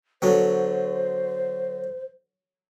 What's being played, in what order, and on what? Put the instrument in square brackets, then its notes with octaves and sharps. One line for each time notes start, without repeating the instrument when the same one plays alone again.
[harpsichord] D3 F#3 B3 [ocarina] C5